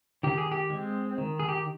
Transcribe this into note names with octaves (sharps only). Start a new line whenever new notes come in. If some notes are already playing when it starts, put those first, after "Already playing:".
D#3 G4
G#4
G4
G#3 C4
D#3
G#4
G4